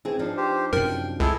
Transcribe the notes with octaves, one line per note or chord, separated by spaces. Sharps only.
E3 C4 G#4
F3 D4 D#4
G4 C5
F#2 C3 A#4 G5
C#2 E4 G#4 A4